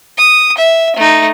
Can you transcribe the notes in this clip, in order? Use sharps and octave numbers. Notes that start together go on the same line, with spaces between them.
D#6
E5
A3 D#4